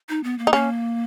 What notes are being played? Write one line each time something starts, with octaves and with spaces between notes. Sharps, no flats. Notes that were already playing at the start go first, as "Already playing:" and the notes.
D#4
B3
A#3
D#4
A#3 C#4